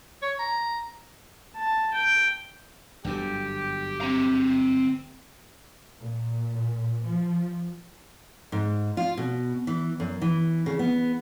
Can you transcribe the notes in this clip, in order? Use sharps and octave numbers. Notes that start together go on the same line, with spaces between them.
C#5
A#5
A5
G5
G1 F#2 D3 G4
C4 A#5
A#2
F3
G#2
F4
B2
E3
F#2
E3
C#3
B3